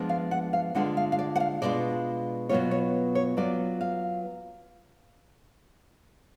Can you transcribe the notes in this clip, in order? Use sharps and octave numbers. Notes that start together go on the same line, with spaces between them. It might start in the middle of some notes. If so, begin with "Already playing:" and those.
Already playing: F3 G#3 B3 D4
F5
F#5
F5
D3 G#3 D4 F4 F#5
F5
F5
D5
F#5
F5
B2 G#3 D4 F4 D5
B2 F#3 B3 F4 C#5
C#5
C#5
F#3 B3 F4 D5
F5